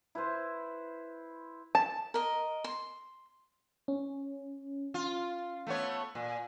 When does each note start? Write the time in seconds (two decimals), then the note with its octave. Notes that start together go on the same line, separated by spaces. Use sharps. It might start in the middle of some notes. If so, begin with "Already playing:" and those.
0.15 E4 B4 C5
1.75 A5
2.14 A#4 D#5
2.64 C6
3.88 C#4
4.94 F4
5.67 A3 B3 C#5
6.15 A#2